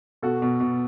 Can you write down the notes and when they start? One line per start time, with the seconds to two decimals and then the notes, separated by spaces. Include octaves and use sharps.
0.22 B2 F#4 A4
0.42 B2
0.60 B2